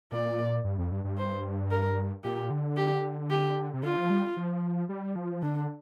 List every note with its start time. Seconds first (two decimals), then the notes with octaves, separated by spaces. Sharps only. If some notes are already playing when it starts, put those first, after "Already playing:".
0.12 A#2 D5
0.64 G2
0.78 F2
0.92 G2
1.04 G2
1.17 C5
1.71 A#4
2.24 A#2 G4
2.50 D3
2.77 G4
3.30 G4
3.74 C3
3.83 D3 F4
3.97 F3
4.10 G3
4.37 F3
4.89 G3
5.16 F3
5.42 D3 D4